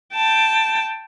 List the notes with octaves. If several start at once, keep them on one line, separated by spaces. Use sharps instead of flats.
G5 A5